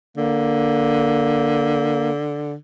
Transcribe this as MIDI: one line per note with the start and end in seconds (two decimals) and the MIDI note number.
0.17 2.55 50
0.17 2.11 58